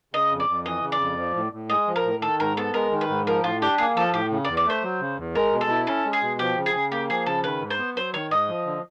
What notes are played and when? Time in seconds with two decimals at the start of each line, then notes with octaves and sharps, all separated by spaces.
0.14 C#3 D#5
0.31 F2
0.40 D5
0.48 F2
0.66 E3 D#5
0.83 C#3
0.92 D5
1.00 F2
1.18 F3
1.36 A2
1.53 A2
1.70 G#3 D#5
1.87 F3
1.96 A#4
2.05 A2
2.22 D#3 A4
2.40 G#2 A#4
2.57 B3 A4
2.74 G#3 A#4
2.92 D#3
3.01 B4
3.09 G#2
3.27 F3 A#4
3.44 A2 F4
3.61 D4 G4
3.78 A#3 G#4
3.96 F3 A4
4.14 A2 G4
4.31 C#3
4.45 D5
4.48 E2
4.57 D5
4.66 A3 C5
4.83 F#3
5.01 C#3
5.18 E2
5.35 G#3 A#4
5.53 B2
5.61 A4
5.70 E4
5.87 C#4 A4
6.05 G#3
6.13 G#4
6.22 B2
6.39 F3 G4
6.58 C#3
6.66 G#4
6.74 C#3
6.92 A#3 G4
7.09 F3 G#4
7.26 C#3 A4
7.44 D#3 B4
7.61 G#2
7.70 C5
7.79 B3
7.96 F#3 C5
8.14 D#3 C#5
8.31 G#2 D#5
8.48 F3
8.66 D3